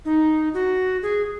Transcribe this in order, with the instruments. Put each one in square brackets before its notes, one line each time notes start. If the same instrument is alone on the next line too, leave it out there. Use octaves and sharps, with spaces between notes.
[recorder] D#4
F#4
G#4